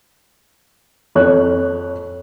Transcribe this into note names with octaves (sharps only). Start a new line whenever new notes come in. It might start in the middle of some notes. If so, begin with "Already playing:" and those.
F2 C#5 F#6